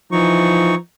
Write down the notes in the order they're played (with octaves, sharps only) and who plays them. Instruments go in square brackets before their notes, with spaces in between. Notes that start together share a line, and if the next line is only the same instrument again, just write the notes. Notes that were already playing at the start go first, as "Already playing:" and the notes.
[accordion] E3 D#4 C#6 [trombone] F3